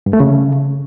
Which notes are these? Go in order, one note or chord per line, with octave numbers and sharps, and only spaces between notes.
G2
A3
C#3